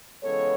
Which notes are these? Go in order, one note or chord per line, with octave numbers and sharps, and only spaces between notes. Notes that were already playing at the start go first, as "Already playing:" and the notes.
C#3 E3 G#3 B3 A4 C#5